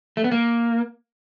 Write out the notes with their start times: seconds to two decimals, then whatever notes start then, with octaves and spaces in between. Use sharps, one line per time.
0.17 A3
0.24 B3
0.32 A#3